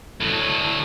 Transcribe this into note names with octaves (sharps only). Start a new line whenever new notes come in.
D2 A2